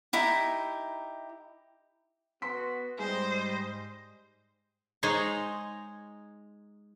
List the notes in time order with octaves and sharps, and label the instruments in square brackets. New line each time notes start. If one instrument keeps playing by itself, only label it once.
[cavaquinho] D#4 E4 G4
[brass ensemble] B3 F#4 [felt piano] C6 B6
[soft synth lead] G#2 [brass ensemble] G3 D#5 [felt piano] G#4 [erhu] C5
[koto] G#3 D#4 G#4 C5 C#5 A#5